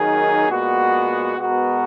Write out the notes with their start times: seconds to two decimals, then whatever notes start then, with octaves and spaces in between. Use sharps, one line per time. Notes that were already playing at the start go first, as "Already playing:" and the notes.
Already playing: D#3 F#3 A#3 D#4 G#4
0.49 A#2 G#3 B3 F#4
1.37 B2 G#3 B3 F#4 A#4